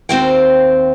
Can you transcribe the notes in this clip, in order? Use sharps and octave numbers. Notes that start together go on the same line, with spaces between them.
D#2 C4 F#4 C5 F5 G5